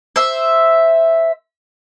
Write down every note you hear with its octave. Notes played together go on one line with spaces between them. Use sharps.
C5 E5